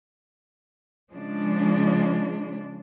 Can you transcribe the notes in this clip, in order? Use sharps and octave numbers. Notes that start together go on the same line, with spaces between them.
C#3 F3 G#3 D4